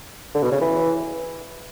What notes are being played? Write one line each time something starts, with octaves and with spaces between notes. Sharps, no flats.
D3
B2
C#3
E3